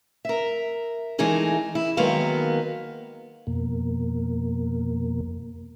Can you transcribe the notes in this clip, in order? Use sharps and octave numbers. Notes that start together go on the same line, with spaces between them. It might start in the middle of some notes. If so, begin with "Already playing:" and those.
A#4 E5
E3 G#3 A3 D#4 G#4 A#4
E4
D#3 F#3 G#3 A#3 B3 F5
F2 B2 A#3